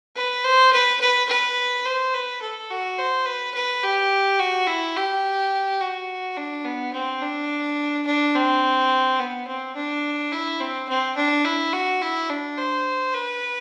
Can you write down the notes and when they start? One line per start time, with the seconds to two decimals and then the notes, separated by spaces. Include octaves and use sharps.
0.16 B4
0.44 C5
0.73 B4
1.01 B4
1.29 B4
1.86 C5
2.14 B4
2.42 A4
2.70 F#4
2.98 C5
3.26 B4
3.55 B4
3.83 G4
4.39 F#4
4.67 E4
4.96 G4
5.81 F#4
6.37 D4
6.65 B3
6.93 C4
7.22 D4
8.06 D4
8.35 C4
9.19 B3
9.47 C4
9.76 D4
10.32 E4
10.60 C4
10.89 C4
11.16 D4
11.45 E4
11.73 F#4
12.02 E4
12.29 D4
12.58 C5
13.14 B4